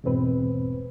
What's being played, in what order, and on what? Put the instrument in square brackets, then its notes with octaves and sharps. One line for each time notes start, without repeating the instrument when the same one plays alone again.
[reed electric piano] E2 G#2 B2 C4 B4